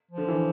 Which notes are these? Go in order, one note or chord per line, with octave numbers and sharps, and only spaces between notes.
F3
D3
E3